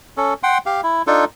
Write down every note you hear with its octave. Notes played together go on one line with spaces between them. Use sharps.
C#4 A4
F#5 G5 C6
G4 F5
E4
D4 D#4 F4 A4